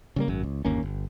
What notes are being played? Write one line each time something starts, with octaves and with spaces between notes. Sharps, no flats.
C#3 G3 A#3
G#1 F#2
C#2
G1 D#2 A#3 C#4
G1